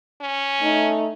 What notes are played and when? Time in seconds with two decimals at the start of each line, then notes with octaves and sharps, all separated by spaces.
0.21 C#4
0.61 A3 D#4